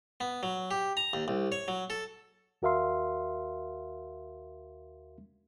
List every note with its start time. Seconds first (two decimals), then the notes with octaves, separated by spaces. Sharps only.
0.21 B3
0.43 F#3
0.71 G4
0.97 A#5
1.13 D#2
1.28 C2
1.52 C#5
1.68 F#3
1.90 A4
2.62 D#2 F#4 A#4 E5 F5 C6